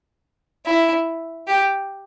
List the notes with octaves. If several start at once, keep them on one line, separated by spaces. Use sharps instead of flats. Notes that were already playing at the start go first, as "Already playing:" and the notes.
E4
G4